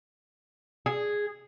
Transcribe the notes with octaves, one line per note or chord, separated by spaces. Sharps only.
G#4